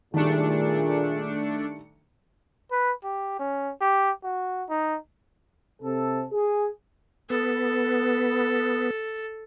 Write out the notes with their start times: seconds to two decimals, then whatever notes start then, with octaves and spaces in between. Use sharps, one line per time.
0.14 A#2 D#3 G3 A3 D4 G#4 C#7
2.72 B4
3.04 G4
3.39 C#4
3.81 G4
4.24 F#4
4.69 D#4
5.82 C3 A4
6.32 G#4
7.30 B3 A4